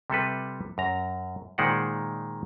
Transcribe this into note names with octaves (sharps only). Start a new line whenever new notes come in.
C3 G3 A4 B4
F#2 A#5
A#2 D#3 G#3 C5 D5 F#5